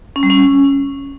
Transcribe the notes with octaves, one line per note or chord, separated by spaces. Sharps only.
C#4
G3
C#4